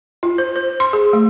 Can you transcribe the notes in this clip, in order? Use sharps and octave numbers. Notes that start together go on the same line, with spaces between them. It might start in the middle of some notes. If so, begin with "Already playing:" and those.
F4
C5
C5
C6
G#4
A3